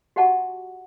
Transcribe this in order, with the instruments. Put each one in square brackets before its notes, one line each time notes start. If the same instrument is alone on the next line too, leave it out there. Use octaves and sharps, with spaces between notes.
[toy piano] F#4 G4 D#5 F#5 A5 C#6